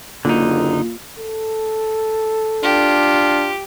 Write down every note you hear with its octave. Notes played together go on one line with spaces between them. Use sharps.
F#1 D3 A#3 D#4 F4
A4
D4 F4 G4